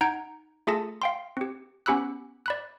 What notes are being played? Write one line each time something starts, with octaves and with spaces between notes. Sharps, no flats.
D#4 F#5 A#5 G6 G#6 D7
A3 F4 G#4 A4 A5 A#6
F5 G5 C6
C4 G4
B3 C#4 G4 B5 E6 F#6
D5 B5 F#6